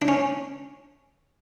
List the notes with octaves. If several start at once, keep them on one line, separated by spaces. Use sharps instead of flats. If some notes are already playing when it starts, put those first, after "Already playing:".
D4
C#4